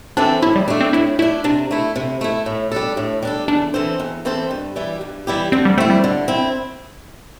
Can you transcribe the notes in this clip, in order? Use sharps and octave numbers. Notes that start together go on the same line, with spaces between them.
E3 C4 D4 A4
A2 E4
G3
A3 D4
C4
A2 E4
A3 D4 E4
C3 D4
A3 E4
C3
A3 E4
A2
G3 D4 A4
A2
G3 D4 A4
E2 D4
E3 C4 A4 C5
E2
E3 C4 A4 C5
G2
E3 G3 E4 G4
G2
E3 G3 E4 G4
D3 C4
G3
A3 C4 E4
G3
D3
C4 E4